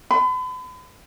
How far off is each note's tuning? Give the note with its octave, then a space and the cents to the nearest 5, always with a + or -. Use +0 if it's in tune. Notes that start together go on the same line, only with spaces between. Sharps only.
B5 +40